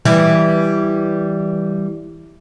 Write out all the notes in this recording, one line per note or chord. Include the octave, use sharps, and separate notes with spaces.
E3 G3 E4